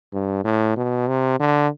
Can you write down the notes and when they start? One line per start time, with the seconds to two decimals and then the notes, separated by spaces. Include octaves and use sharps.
0.13 G2
0.44 A2
0.77 B2
1.08 C3
1.40 D3